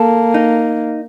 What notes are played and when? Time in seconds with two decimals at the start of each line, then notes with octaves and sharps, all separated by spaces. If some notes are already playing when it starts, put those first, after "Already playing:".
Already playing: A#3 A4
0.34 D#4